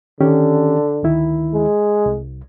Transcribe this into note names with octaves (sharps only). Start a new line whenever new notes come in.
D3 D#3 C#4 G4
D2 D#3 E4
G#3
C2